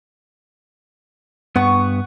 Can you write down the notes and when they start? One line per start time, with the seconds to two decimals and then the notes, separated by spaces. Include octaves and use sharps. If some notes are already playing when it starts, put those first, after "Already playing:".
1.56 G2 B3 F#5 C#6